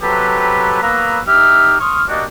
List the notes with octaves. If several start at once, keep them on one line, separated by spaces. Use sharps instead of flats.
C3 F#3 G4 A4 B4
F#3 A#3 B3 B4 A#5 E6
D#4 G4 E5 F6
C6 C#6 D#6 F6
A#3 D4 F#4 G4 D5 D#5